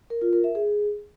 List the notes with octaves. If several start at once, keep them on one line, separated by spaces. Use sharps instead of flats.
A#4
F4
A#4
E5
G#4